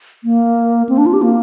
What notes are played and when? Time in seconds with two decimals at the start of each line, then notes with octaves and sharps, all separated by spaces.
0.24 A#3
0.89 C4
0.98 D4
1.06 F4
1.13 G4
1.22 A#3